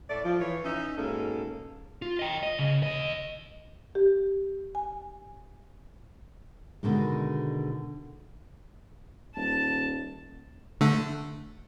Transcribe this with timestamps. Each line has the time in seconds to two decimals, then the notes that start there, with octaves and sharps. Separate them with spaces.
0.10 A2 A3 D5
0.25 F3
0.40 E3 C#5
0.65 C#4 D#4 E5
0.97 G#2 B2 A#3 C#4 A4
2.02 F4
2.19 D#5 G5
2.43 D#5
2.59 C#3
2.83 D#2 D#5
3.95 G4
4.75 G#5
6.83 B2 D3 D#3 G#3
9.36 D#1 A5
10.81 D3 A3